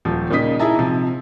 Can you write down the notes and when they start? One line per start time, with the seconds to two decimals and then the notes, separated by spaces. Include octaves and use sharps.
0.05 D#1 F3
0.30 A#2 C#3 D#4 D#6 B6
0.59 D#4 E4 G#4 E5 A5 A#5
0.76 C3 F3